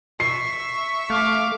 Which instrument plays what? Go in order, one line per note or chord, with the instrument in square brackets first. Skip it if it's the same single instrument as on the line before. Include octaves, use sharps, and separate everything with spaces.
[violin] E5 C#6 [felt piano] C7
[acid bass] A3 [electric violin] F5 D6